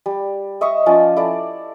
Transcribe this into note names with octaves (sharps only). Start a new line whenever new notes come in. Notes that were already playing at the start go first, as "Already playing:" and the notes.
G3
D#5 E5 C#6 D#6
F3 C#4 F4 D5
E4 A4 D5